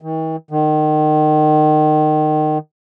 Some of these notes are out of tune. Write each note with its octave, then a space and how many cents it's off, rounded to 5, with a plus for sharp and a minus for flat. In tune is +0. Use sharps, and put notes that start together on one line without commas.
D#3 +45
D#3 -25